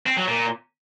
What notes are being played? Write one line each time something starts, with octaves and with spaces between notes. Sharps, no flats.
C4
F#3
A#2